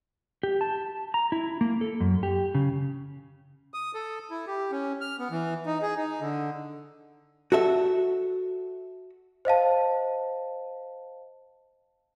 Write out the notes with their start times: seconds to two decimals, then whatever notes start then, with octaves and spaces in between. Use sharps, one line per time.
0.43 G4
0.61 A5
1.14 A#5
1.32 E4
1.61 A#3
1.81 A4
2.00 F#2
2.23 G4
2.55 C#3
3.74 D#6
3.94 A4
4.30 E4
4.47 G4
4.71 C#4
5.01 F6
5.19 B3
5.31 E3
5.66 D#4
5.82 G#4
5.96 D#4
6.21 D3
7.52 F#4 A4 E5
9.45 C5 D#5 F5 A5